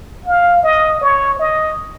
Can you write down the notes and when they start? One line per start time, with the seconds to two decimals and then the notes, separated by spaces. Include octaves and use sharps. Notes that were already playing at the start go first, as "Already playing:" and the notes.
0.26 F5
0.63 D#5
1.02 C#5
1.39 D#5